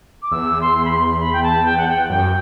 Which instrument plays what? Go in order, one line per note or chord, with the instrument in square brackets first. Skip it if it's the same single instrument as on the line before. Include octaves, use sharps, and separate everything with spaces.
[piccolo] D6
[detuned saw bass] E2 [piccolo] E6
[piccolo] C6
B5
C6
B5
G5
A5
G5
F#5
G5
[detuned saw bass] F#2 [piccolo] G5